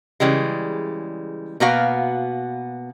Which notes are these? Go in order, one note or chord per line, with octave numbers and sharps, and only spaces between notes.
C#3 E3 G3 G#3
B2 A#3 B3 F#4 B4 F5